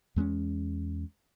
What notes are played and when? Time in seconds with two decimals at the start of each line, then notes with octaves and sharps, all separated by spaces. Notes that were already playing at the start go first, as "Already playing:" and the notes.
0.16 E2 G#3 B3 C#4